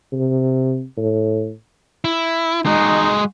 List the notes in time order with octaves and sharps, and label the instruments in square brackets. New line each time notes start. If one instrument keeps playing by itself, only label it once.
[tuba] C3
A2
[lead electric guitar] E4
[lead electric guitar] G#3 F#4 [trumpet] D#4